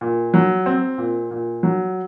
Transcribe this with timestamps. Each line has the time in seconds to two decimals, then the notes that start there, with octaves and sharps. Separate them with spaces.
0.01 A#2
0.34 F#3
0.66 C4
0.98 A#2
1.31 A#2
1.63 F#3